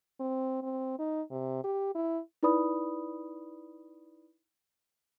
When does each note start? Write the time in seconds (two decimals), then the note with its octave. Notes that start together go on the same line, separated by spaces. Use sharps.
0.20 C4
0.62 C4
0.99 D#4
1.30 C3
1.64 G4
1.95 E4
2.43 D#4 E4 B4 D5 B5 D#6